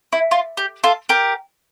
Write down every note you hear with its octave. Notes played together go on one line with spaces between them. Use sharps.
E4
F4
G4
F4 A4
G4 A#4